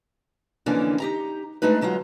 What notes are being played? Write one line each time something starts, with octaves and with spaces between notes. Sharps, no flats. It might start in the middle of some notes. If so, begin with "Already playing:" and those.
F2 D3 E3 A#3 C#4 D4
D#4 G4 A#5
G#3 A3 D4 D#4 B4
D3 F#3 G#3 F4